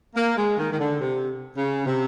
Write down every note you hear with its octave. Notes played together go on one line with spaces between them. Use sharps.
A#3
G#3
D#3
D#3
D3
C3
C#3
C3